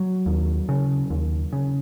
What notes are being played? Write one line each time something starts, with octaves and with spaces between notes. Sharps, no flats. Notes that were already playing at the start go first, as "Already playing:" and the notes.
Already playing: F#3
D#2
C#3
D#2
C#3